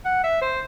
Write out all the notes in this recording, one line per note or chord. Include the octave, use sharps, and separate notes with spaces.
F#5
E5
C5